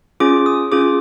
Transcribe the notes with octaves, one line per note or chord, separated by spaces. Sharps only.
C#4 F4 G#4 D6
D#6
C#4 F4 G#4 D6